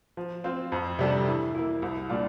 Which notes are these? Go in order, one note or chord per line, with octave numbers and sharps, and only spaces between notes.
F3
C4 F4 C5
F2
C3 G3 D4 A4
E3
A#3 E4
C2
A#2 G3 D4 F4